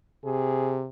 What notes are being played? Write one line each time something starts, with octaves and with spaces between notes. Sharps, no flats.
C3 G#4